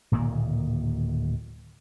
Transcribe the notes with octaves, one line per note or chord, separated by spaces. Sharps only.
D1 A#2 D#3 A#3